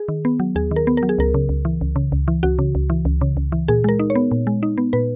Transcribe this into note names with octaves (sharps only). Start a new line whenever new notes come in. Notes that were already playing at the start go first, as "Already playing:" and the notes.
Already playing: G#4
D#3
B3
F#3
D#2 G#4
D#3
A#4
B3
A#4
F#3
G#4
C#2 A#4
C#3
C#2
E3
C#2
C#3
C#2
E3
C#2 F#4
C#3
C#2
E3
C#2
C#3
C#2
E3
A#2 G#4
G#3 A#4
D#4
C#5
B3
A#2
G#3
D#4
B3
A#2 B4